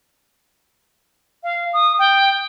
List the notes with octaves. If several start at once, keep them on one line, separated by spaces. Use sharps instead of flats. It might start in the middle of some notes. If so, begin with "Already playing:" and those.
F5
D#6
G5